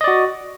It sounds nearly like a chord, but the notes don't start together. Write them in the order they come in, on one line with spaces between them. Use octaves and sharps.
D#5 D5 F#4